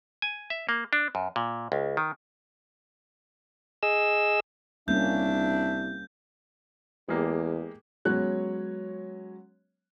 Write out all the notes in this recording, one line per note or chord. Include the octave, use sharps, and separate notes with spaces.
G#5
E5
A#3
D4
F#2
A#2
C#2
D#3
G#4 D#5 E6
C2 G3 A#3 C#4 D4 E5 G6
E2 G#3 A#3 G4
F#3 G#3 B3 C#4 C#5 F#6